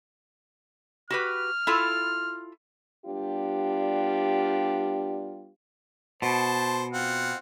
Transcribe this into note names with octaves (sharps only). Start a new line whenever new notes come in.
F#4 G4 B4 F6
E4 F4 A4
G3 B3 D4 F4 G4
B2 C5 A5
C4 F4 F#5